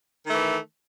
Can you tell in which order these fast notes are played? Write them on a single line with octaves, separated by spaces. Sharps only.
D#3 A3 E3